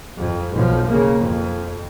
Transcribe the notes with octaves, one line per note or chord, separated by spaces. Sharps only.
F2
B1 F3
C#3 A#3
F2